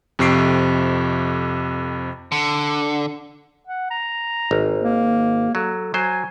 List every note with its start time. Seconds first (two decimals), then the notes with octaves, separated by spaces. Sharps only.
0.19 F2 C3 C#6 C7 D7
2.32 D3
3.67 F#5
3.90 A#5
4.51 G#1
4.83 A#3
5.55 F#3 A4
5.94 F#3 C5 G#5